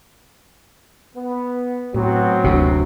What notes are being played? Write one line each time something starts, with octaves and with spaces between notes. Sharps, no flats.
B3
A2 F#3 B3 C4
F#1 D2 C3